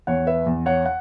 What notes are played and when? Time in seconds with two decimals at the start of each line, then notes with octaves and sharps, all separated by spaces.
0.07 E2 C#5 F#5
0.27 B4 E5
0.46 E2
0.66 C#5 F#5
0.86 F#5